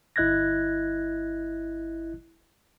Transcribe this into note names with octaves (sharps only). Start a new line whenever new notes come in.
G1 E4 D#5 F#6 G#6 A#6